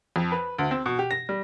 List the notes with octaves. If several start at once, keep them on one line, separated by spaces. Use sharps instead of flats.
F2
B4
D2
C4
B2
G4
A#6
G3